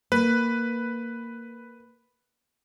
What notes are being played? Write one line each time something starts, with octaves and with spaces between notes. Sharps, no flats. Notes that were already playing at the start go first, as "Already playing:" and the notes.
A#3 B4